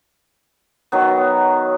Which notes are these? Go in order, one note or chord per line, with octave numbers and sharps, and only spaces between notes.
D#3 F#3 B3